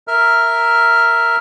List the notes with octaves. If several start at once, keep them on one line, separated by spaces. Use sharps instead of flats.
A#4 E5 F6